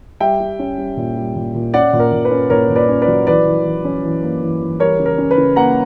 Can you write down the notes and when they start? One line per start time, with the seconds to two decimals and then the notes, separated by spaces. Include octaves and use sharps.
0.20 G3 E5 G5
0.40 G3
0.59 C#4
0.78 G3
0.97 A#2
1.16 G3
1.36 A#2
1.55 A#2
1.74 C#4 D5 F#5
1.93 A#2
2.00 A#4
2.12 A#2
2.25 B4
2.31 C#4
2.50 A#2 A#4 C#5
2.70 A#2
2.76 B4 D5
2.89 C#4
3.02 B4 D5
3.08 F#3
3.27 E3 B4 D5
3.46 E3
3.65 E3
3.85 C#4
4.03 E3
4.23 A#3
4.42 E3
4.61 E3
4.80 G3 A#4 C#5
5.00 C#3
5.06 A#4
5.18 C#4
5.31 B4
5.38 C#3
5.56 A#3 F#5 A#5